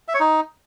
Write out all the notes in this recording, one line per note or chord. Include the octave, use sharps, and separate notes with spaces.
E5
C#5
D#4